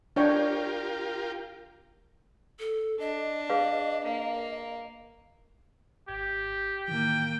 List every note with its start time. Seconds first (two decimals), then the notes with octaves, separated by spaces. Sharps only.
0.16 D4 F4 G4 A#4 C#5 G5
2.60 A4
3.00 D4 D#5
3.50 G#4 B4 F5
4.05 A#3 F5
6.08 G#1 G4 G#6
6.88 A2 D#3 E3 A#3 G5